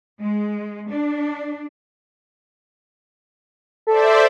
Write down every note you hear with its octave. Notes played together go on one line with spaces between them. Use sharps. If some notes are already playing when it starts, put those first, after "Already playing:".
G#3
D4
A4 C5 D5 E5